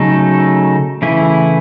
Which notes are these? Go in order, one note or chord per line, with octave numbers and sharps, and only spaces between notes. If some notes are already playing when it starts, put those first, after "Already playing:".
Already playing: C#3 F#3 A3 D#4 A4
C#3 E3 A3 E4